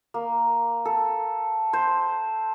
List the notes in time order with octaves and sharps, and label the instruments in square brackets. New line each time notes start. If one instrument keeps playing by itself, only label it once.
[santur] A#3
A4
C5